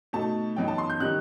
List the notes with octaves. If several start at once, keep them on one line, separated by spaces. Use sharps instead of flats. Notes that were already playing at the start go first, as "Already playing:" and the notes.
B2 A3 D#4 A5
F#2 E3 B3 D#4 G5
A5
C6
G6
D#3 G3 D#4 F#6